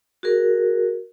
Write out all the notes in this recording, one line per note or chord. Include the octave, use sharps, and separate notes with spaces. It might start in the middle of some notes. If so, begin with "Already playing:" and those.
F#4 G#4 A#4